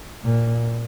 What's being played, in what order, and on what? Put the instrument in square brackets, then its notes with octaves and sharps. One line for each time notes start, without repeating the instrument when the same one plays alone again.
[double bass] A#2